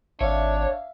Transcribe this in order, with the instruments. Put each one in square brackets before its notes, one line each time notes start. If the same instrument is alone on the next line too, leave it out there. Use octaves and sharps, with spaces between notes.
[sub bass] G#1 [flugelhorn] D4 [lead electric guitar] C#5 [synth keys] E5 F5